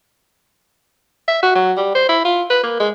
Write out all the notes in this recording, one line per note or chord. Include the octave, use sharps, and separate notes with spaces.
E5
F#4
F#3
G3
C5
E4
F4
B4
A#3
G#3